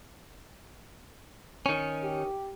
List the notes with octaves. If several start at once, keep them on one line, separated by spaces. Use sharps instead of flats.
D#3 C#4
G4